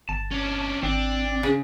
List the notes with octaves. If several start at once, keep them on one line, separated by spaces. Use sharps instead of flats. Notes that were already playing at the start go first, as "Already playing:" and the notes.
G1 A5
C#4 D4
G#1 C4 D4
C#3